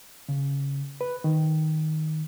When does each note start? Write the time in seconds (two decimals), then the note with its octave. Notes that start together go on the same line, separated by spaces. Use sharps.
0.29 C#3
1.01 B4
1.24 D#3